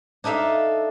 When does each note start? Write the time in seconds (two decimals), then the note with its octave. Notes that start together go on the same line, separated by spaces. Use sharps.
0.24 D4 D#4 A4 E5 F5